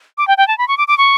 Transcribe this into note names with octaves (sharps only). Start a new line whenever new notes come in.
D6
G5
G5
A5
B5
C#6
D6
D6
C#6